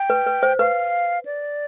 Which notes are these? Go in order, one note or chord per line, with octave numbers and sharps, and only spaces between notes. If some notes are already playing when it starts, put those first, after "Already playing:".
Already playing: G5
B4
B4
C5
B4 F5
D5